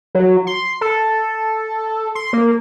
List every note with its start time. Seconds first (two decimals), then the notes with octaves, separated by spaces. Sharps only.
0.15 F#3
0.47 C6
0.81 A4
2.15 C6
2.33 A#3